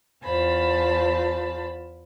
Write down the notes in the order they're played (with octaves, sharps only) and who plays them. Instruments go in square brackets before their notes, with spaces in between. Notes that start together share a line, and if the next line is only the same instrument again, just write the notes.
[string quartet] E2 F4 C5 A5 B5